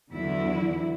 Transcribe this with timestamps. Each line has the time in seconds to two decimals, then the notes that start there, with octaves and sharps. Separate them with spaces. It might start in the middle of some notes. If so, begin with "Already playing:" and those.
0.12 E2 D3 E3 F#3 E4